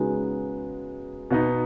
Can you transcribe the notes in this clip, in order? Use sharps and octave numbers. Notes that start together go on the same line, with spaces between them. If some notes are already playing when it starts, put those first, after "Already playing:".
Already playing: C#3 G#3 B3 D#4 F#4
B2 B3 D#4